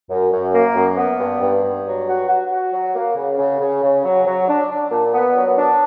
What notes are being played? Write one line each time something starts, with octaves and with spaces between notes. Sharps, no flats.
F#2
F#2
A#3
F#2
B3
G2
G2
G2
F#3
F#4
F#4
F#4
F#3
A#3
C#3
C#3
C#3
C#3
F#3
F#3
D4
D4
A#2
B3
F#3
D4